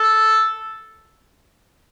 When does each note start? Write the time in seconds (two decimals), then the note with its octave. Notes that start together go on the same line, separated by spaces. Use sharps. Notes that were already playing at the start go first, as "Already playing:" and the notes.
Already playing: A4